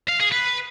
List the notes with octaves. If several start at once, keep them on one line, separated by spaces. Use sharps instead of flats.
F5
G#4
B4